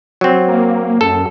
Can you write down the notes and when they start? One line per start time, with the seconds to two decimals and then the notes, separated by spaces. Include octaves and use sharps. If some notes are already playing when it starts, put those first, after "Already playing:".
0.21 F#3 C4
0.48 A#3
1.01 F#2 A4